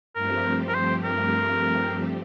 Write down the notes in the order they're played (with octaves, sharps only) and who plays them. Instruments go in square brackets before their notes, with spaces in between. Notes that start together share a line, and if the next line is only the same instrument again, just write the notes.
[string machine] G2 F3 A3 C4 G4 [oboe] A#4
[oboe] A#4
C5
A#4